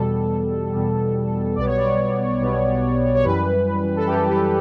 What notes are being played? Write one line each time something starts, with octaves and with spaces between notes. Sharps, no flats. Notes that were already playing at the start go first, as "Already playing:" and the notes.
Already playing: E2 B2 G3 A4
E2 B2 G3
B1 B2 G3 B3 D5
C#5
D5
B1 B2 G3 B3
C#5
F#2 E3 G3 B4
A4
F#2 E3 G3 G4
G4